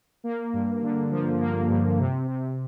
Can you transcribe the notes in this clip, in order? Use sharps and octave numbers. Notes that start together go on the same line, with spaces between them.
A#3
G2
D3
F3
A#3
G2
C3
C3